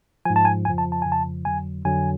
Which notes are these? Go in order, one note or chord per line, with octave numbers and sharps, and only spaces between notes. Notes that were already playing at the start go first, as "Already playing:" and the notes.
G#2 F3 G#5
A5
G#5
F2 C#3 F3 G#5
A5
A5
F2 C#3 F3 G#5
A5
F2 D3 F#3 G#5
F2 D3 F#3 G#5